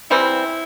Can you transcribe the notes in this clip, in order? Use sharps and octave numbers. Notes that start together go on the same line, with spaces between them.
C3 E3 G3 C4 E4